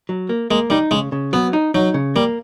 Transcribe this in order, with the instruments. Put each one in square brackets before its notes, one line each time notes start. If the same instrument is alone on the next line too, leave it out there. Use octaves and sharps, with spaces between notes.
[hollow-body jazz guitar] F#3
A#3
[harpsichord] G#3 [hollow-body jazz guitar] A#3
[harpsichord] G3 [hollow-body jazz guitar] D#4
[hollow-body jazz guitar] C#3 [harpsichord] G#3
[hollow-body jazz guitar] C#3
[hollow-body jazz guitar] F#3 [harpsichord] B3
[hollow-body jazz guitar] D#4
[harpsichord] F#3 [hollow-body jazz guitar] D#4
[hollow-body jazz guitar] C#3
[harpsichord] G3 [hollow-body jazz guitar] A#3